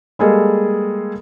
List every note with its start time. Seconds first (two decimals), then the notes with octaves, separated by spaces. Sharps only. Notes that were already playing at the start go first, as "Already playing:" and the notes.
0.19 G3 G#3 A#3 G#4 A4 D#5